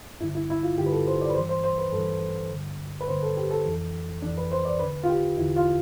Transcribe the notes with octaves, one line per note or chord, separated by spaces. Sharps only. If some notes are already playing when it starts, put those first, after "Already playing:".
G2 D3 E4
E4
E4
F4
G2 D3 G4
B4
A4
C5
D5
B4
G2 E3 C5
C5
C5
B4
G2 E3 A4
G2 D3
B4
G2 D3 C5
A4
G4
A4
F2 E3
F2 E3 D4
B4
C5
D5
E2 D3 B4
F4
G4
E2 D3 E4
F4